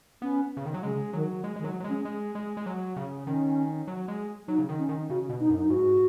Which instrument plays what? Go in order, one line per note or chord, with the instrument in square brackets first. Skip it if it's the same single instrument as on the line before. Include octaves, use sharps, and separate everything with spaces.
[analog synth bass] B3 [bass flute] C#4
[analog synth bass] C#3
D#3
F#3
[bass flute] C#3 [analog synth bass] G#3
[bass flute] D#3 [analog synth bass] F#3
[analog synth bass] G#3
[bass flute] D#3 [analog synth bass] G#3
[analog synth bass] F#3
F#3
G#3
[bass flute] C#4
[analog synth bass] G#3
G#3
G#3
F#3
C#3
[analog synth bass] D#3 [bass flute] C#4
[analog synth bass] F#3
G#3
[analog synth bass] F#3 [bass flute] D#4
[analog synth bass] C#3
D#3
[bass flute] C#4
[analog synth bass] D#3
[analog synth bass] C#3 [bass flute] F#4
[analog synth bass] B2
[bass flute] D#4
[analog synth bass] F#2
[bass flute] D#4
[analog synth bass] G#2 [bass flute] F#4